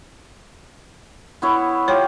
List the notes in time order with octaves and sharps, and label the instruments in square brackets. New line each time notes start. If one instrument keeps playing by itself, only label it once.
[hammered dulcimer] B3 E4 C#5
[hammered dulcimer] F4 G4 [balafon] C#5